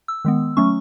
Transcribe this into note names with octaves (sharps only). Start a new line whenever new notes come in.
E6
D#3 G#3 B3
F#3 A3 C#4 C#6